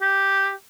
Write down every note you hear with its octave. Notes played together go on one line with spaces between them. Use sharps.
G4